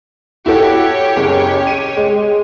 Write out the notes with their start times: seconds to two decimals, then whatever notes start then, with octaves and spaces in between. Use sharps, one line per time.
0.46 E4 F#4 G4 A4 C#5
1.16 F#1 G#4
1.67 D#7
1.97 G#3